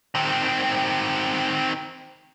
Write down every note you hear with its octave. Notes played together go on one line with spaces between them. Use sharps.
D#3 C4